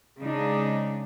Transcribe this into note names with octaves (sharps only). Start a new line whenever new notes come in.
C#3 G#3 D4 D#4